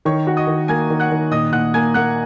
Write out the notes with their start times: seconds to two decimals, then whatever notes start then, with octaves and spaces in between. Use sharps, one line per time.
0.05 D#3 C#5 C#6
0.27 F#4
0.37 D#5 D#6
0.47 D#3
0.68 A#3 G#5 G#6
0.90 D#3
1.00 F#5 F#6
1.11 D#3
1.31 A#2 D#5 D#6
1.52 A#2 F#5 F#6
1.74 A#3 G#5 G#6
1.94 A#3 F#5 F#6